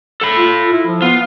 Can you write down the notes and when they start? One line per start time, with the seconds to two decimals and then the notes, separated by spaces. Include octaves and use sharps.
0.21 A4 B5
0.36 F4
0.72 E4
0.86 F3
1.02 B3 F4